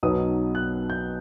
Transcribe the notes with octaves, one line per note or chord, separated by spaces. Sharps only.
B1 B2 F#3 B3 D#4 D#6
F#6
G6